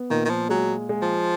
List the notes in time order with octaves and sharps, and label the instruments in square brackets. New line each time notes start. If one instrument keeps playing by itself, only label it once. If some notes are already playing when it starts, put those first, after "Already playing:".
Already playing: [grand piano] B3
[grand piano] A#2 [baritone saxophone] D#3
[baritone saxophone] D#3
F3
[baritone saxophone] F#3 [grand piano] G#3
[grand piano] G#3
[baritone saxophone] F3